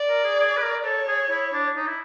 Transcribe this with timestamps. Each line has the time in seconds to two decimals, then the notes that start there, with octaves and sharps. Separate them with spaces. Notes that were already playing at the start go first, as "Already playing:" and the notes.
Already playing: D5
0.09 A#4
0.24 G#4
0.39 G#4
0.57 B4
0.62 A#4
0.85 A4 C#5
1.08 G#4
1.30 E4
1.53 D4
1.76 D#4
1.87 E4